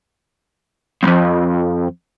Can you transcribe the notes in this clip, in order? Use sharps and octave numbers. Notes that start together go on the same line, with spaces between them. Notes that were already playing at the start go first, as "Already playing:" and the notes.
B1 F2